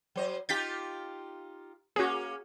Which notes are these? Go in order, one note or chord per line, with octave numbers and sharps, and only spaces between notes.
F#3 C5 D#5
D#4 F4 G4 G6 A6 B6
A#3 C#4 F#4 G#4